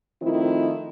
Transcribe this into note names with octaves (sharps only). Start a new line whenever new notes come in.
D#3 F3 A3 C4 E4 F4